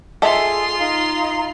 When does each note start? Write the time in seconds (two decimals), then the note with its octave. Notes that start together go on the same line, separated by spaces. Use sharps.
0.22 F4 G#4 A4 D#5 E5 C6
0.79 D#4 F5 A#5